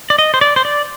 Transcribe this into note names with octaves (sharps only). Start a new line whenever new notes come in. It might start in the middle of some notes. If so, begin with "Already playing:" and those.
D5
D#5
C5
D5
C5
D5